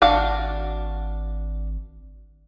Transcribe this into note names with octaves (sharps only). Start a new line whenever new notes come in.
G#1 D4 F#4 F5